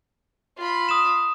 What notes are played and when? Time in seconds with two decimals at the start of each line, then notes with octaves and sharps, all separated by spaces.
0.57 F4 B5
0.89 D#6 E7